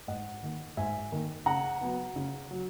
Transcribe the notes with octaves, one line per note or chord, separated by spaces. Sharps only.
G#2 D#5 F#5
D#3 A#3
G#2 E5 G#5
D#3 A#3
C#3 F#5 A#5
F#3 B3
C#3
F#3